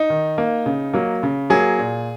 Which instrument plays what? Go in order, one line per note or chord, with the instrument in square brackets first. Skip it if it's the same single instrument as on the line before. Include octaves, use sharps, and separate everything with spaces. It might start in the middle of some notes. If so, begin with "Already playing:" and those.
Already playing: [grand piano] D#4
D#3
A#3
C#3
F#3 A#3
C#3
F#3 A#3 G#4
A#2